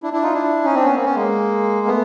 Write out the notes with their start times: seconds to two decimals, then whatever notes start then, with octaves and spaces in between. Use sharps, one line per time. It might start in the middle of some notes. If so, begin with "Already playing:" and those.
0.03 D4 E4
0.13 D4 E4
0.23 D#4 F4
0.34 D4 E4
0.64 C#4 D#4
0.75 C4 D4
0.85 B3 C#4
0.95 A#3 C4
1.05 B3 C#4
1.15 G#3 A#3
1.87 A3 B3